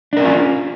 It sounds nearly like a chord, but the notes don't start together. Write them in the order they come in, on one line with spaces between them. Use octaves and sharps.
D4 A#4 C#4 F4